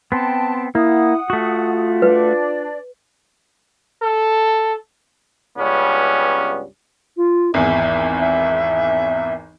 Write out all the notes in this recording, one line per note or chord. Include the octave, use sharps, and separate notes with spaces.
B3 C4 G5 A5 C6
A#3 E4 F#5 D#6
A3 F4 F#4
D4 B4 D5
A4
C#2 G2 B3 C#4
F4
G#1 E2 E5
E5